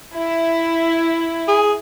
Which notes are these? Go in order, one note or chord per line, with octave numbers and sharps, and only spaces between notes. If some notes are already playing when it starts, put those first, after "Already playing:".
E4
G#4